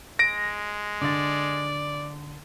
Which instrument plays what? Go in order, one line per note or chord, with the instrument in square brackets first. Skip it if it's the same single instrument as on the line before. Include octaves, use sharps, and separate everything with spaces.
[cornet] G#3 [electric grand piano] A#6 D7
[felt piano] D3 A6 [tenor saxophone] D5